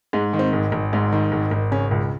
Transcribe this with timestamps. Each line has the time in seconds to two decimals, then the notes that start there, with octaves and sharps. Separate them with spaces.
0.13 G#2 G#3
0.33 D#3
0.39 C4
0.53 G#1
0.72 G#1
0.93 G#2
1.12 D#3
1.32 G#1
1.51 G#1
1.71 C#3 C#4
1.91 C#2